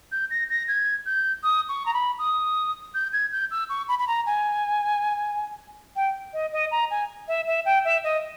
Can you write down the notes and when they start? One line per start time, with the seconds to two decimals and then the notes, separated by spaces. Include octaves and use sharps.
0.12 G6
0.31 A#6
0.50 A#6
0.68 G#6
1.06 G6
1.43 D#6
1.69 C#6
1.86 A#5
1.94 B5
2.19 D#6
2.94 G6
3.13 G#6
3.32 G6
3.51 E6
3.70 C#6
3.89 B5
3.99 B5
4.08 A#5
4.26 G#5
5.96 G5
6.33 D#5
6.52 D#5
6.71 A#5
6.90 G#5
7.28 E5
7.47 E5
7.66 G5
7.85 E5
8.04 D#5